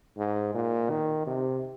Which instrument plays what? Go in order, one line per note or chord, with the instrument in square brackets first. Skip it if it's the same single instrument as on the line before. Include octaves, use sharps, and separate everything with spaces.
[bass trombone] G#2
A#2
D#3
C3